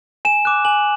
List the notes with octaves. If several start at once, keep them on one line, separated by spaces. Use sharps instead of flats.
G#5 E7
D6 F#6
G#5 F#7